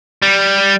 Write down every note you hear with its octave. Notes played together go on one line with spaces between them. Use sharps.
G3